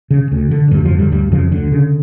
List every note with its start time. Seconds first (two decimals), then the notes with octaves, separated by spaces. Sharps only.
0.11 C#3
0.32 D2
0.51 D3
0.71 D2 G2 G3
0.85 F2 F3
0.91 D3
0.99 G2 G3
1.12 D2 G2 G3
1.32 F2 C#3 F3
1.52 D2 D3
1.72 C#3